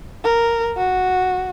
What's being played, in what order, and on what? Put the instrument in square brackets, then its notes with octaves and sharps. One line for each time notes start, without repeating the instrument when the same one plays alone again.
[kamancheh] A#4
F#4